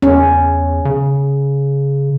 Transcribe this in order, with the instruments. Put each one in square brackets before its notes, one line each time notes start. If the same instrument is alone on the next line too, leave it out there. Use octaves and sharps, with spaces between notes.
[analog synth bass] E2 [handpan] C#4
[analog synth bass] C#3